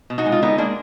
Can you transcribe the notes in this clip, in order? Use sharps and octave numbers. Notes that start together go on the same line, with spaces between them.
B2
D#4 F#4
G#3
F4
D3 B3 D#4
G#3 A#3 D4